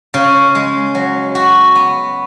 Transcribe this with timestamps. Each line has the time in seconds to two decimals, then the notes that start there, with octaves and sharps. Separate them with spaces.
0.14 C#3
0.55 G#3
0.95 F#3
1.35 F#4
1.75 B3